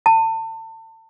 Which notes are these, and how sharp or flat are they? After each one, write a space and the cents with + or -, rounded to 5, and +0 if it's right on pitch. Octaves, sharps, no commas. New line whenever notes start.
A5 +35